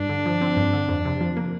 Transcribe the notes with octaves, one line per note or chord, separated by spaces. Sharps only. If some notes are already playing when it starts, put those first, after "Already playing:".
Already playing: G2 D4
D3
F3
C4
G2
D3
F2
C3
F3
A#3